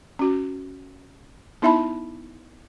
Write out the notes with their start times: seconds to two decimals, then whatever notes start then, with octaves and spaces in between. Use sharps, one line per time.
0.19 C#4 F#4
1.62 B3 D#4 E4 E5 A5 B5